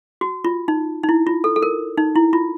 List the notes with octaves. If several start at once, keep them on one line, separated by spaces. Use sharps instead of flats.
F#4
F4
D#4
D#4
E4
F4
A4
A4
A#4
D#4
E4
F4